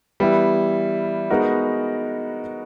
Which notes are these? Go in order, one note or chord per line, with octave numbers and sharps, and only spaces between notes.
E3 G3 B3 E4
G#3 B3 D#4 F#4 A#4